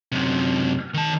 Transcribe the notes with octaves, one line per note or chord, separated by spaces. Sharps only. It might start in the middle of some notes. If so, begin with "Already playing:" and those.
F#2 C3
D#3 A5